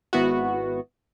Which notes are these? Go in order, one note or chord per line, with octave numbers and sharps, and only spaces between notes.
G#1 B3 E4 F#4